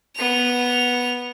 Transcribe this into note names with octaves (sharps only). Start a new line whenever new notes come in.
B3 F7